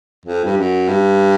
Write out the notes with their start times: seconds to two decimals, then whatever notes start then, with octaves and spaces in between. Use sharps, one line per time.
0.25 F2
0.45 G2
0.57 F#2
0.88 G2